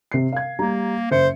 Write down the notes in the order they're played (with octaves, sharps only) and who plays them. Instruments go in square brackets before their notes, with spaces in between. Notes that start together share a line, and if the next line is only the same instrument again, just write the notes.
[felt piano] C3 C7
F5 G#6
[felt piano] G3 A#5 [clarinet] A#3
[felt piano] F#1 E5 C#7 [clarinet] C5